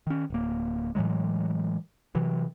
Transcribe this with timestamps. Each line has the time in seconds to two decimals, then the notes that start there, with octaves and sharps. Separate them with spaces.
0.07 D#3 C#4
0.30 D1 A#3
0.95 A2 E3 F#3 G#3
2.15 C3 E3 F#3